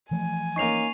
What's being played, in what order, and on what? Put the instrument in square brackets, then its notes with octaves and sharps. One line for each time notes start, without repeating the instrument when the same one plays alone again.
[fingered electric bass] E3 F3 A3 [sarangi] G#5
[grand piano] A#3 C#4 D#4 [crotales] C#6 C7 F7